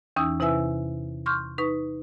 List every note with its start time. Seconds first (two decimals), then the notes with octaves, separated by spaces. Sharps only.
0.16 E2 E3 C#4 D#4 D#6 E6
0.40 C3 E4 B4 E5 G#5 E6
1.26 C6 C#6 F6 G6
1.58 D#4 B4 C#6